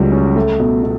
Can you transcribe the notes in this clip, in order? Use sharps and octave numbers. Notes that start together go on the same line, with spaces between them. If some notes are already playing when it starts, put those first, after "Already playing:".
Already playing: C#2 F#3 G3
C#4
A3
B2
B2